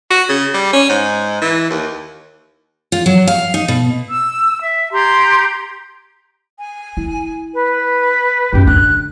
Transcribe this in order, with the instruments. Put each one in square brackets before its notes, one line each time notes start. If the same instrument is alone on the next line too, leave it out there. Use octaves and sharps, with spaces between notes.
[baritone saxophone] F#4
C#3
G3
C#4
G#2
E3
D#2
[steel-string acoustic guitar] F4
F#3
F5
D#4
B2
[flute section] E6
E5
G4 A#5 C6 G#6
[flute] G#5
[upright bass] E4
[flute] B4
[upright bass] F#2 D#4 [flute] G4
[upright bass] D3 D4 [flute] F#6